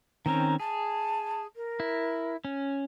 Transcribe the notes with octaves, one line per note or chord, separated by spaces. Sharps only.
D#3 C4 C#4 A#5
G#4 A5
A#4
E4
C#4